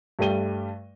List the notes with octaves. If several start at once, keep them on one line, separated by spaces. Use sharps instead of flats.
G2 G3 A3 G5 D#7 G7